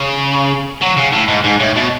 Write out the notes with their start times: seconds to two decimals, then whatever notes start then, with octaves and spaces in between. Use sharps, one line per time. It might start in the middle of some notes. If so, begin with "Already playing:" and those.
Already playing: C#3
0.82 F#3
0.97 C#3
1.13 A2
1.28 G#2
1.44 G#2
1.60 A2
1.76 B2